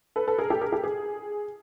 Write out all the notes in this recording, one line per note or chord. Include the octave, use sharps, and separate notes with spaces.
A4 B4
A4 B4
G#4 A#4
G4 A4
G#4 A#4
G4 A4
G#4